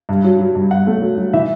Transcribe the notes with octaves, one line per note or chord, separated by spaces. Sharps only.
G2
F#3
F#3
G2
G2 F#5
A3
F#3
F#3
E3 E5